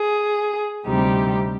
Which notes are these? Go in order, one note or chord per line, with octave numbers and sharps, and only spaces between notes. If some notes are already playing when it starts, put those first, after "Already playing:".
Already playing: G#4
D2 C3 G3 C4 D#4 G4